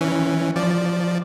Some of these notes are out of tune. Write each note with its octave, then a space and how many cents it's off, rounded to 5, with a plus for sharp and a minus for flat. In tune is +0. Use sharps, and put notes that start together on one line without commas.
E3 +0 C#4 +0
F3 +0 D5 +0